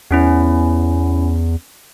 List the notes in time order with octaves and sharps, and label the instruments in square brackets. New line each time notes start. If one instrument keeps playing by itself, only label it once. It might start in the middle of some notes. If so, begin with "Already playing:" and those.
[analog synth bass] E2 [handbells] B3 C#4 E4